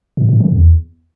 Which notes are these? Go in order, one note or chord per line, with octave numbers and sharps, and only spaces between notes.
A2
A2
D3
E2